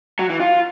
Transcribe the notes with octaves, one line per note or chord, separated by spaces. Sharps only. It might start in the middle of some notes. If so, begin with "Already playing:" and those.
F#3
E3
F4